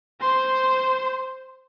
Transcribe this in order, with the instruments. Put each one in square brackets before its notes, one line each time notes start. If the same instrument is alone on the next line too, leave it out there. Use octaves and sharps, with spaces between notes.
[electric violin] C5 C6